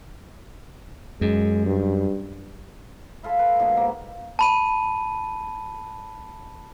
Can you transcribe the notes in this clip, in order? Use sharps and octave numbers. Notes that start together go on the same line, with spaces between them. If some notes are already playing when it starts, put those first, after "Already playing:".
F#2 G#3
G2
E4 F4 A4 E5
B4
G#2 B2 A#3 E4
A#3
A5 B5 D#7